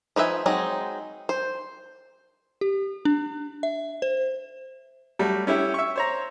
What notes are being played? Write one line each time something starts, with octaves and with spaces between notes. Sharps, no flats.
F3 D#4 B4 E5 G#5
F#3 G#3 C4 D#4
C5
G4
D4
E5
C5
F#3 G3 A3
C#4 E4 G4 E5 G5
E5 C#6
C5 C#5 A#5